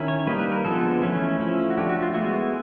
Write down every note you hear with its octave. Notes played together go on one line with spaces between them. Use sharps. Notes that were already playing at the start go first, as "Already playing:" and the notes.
Already playing: D#3 C#4 E4
C#5
G3 A#3 D#4 B4
B4
A#4
D3 F3 G#3 B3 A4
E3 A3 C#4 E4
F3 A3 C#4 E4
F#4
F3 A3 D4 G4
F#4
F4
G#3 B3 E4 F#4